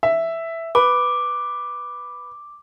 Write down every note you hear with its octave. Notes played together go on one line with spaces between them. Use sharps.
E5
B4 D6